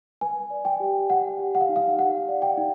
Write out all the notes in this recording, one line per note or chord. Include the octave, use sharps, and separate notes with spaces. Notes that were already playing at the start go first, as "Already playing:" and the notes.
B4 G#5
D5
G5
G4
G4 F#5
G4
F#5
F5
D#4
F5
G4 F#5
D5
G5
D#4